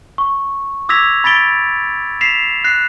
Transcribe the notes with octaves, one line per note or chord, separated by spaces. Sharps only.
C#6
D6 E6 G#6 A#6 B6 F7
B5 A6 B6 D7 G7
B6 C7 E7 F7
F#6 A#6 C7